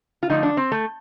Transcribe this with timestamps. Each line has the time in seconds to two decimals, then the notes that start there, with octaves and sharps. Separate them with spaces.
0.23 F4
0.30 D3 F3 A3 D#4
0.43 D4
0.57 C4
0.72 A3